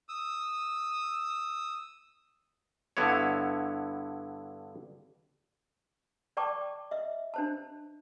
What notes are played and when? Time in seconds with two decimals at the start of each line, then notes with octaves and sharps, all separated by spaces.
0.09 D#6 E6
2.97 G2 D3 B3 E4 C#5
6.37 D5 G5 A5 C#6 D6
6.91 D#5 E5
7.34 D4 C5 A5